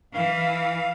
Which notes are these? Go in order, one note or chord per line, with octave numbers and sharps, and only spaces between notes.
E3 F5